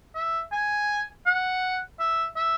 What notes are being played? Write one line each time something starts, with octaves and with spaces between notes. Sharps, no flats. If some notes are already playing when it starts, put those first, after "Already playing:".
E5
G#5
F#5
E5
E5